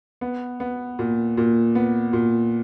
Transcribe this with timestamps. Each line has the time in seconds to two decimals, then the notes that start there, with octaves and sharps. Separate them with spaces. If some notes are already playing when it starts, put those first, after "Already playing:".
0.21 B3
0.60 B3
0.99 A#2
1.37 A#2
1.75 B3
2.13 A#2